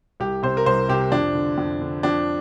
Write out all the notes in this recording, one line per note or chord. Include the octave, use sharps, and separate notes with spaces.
C2 G4
C3 C5
A#4
C2 C5
C3 G4
F2 D4
D3
F2
D3
F2 D4